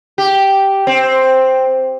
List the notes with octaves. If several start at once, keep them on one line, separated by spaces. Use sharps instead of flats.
G4
C4